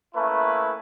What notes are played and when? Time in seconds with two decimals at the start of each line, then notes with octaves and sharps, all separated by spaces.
0.15 A3 A#3 C#4 E4 B4